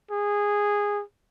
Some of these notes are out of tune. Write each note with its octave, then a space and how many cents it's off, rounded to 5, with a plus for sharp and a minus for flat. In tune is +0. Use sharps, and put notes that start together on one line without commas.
G#4 -15